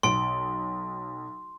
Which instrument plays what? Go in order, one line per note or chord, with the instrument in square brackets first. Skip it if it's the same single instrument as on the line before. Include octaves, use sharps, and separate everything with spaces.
[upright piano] B1 D7 [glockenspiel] C6